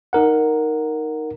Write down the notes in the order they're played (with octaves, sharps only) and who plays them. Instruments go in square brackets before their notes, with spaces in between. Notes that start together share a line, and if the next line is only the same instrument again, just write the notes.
[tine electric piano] D#4 A#4 F#5